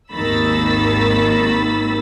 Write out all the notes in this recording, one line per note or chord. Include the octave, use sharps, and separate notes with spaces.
G#1 D#2 D#3 B5 E6 A6